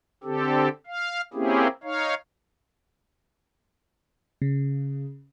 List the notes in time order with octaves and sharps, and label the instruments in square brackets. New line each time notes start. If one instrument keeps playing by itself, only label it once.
[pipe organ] D3 C4 G4 A4
F5
A#3 C4 C#4 E4 G4 G#4
D#4 C#5 F5
[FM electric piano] C#3